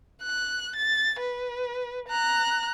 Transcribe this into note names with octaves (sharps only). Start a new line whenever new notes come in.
F#6
A6
B4
A#5 F#6